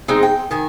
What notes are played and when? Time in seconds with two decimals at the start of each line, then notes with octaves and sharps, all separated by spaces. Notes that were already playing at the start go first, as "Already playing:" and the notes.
0.08 G#3 C4 D#4
0.23 G5
0.51 D#3 G#5